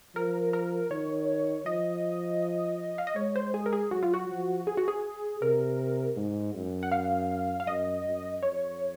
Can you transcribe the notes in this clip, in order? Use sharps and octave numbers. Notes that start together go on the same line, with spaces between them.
F3 A#4
A#4
D#3 C#5
F3 D#5
F5
D#5
G#3 C#5
C5
G#4
A#4
G#4
F#3 F#4
F4
F#4
F3
G#4
F#4
G#4
C3 A#4
G#2
F#2
F#5
F5
F5
F#2 D#5
F#2
F2 C#5